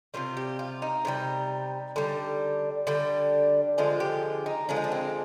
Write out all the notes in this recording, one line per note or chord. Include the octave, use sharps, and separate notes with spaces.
C3 D#3 G3 F4
G4
F4
D#4
C3 D#3 G3
D3 G3
D3 G3 D4
D3 F3 G#3 F4
G4
D#4
D3 F3 G#3 D4
D#4
D4
C4